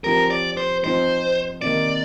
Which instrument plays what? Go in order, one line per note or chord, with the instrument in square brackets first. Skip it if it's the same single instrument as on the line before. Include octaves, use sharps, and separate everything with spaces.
[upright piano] F3 C4 G4 [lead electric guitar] A#4
[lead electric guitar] D5
C5
[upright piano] F3 C4 D#4 [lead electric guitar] C5
[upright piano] C3 D#3 A#3 [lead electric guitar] D5